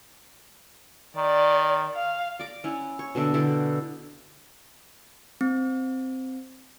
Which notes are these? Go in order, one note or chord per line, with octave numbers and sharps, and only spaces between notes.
D#3 D5
F5
D5 A#5 D6
C#4 E4 F#5
C#5
B2 D3 D4 E5
D3 E4 G4 A4
C4